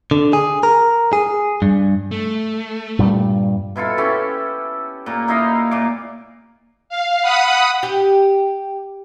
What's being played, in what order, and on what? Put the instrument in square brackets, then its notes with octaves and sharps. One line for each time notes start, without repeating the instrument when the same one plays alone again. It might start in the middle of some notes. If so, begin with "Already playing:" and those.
[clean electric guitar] D3
G#4
A#4
G#4
G2
[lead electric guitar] A3
[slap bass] G2 A#2 G3
[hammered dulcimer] B2 E4 F4 A4
C#4 E4 G4 A4
A#2 A#3
D#4 E4 D#5 F5
A#2 F5 D6
[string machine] F5
F#5 B5 D#6
[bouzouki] G4